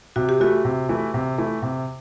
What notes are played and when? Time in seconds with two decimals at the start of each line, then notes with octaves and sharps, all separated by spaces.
0.16 C3 F#4
0.29 G4
0.40 E3 A3 E4 F#4
0.65 C3
0.89 E3 A3 E4
1.14 C3
1.38 E3 A3 E4
1.62 C3